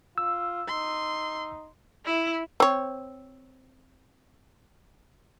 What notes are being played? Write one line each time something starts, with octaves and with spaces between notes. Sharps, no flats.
F4 E6
D#4 C6
E4
C4 C#5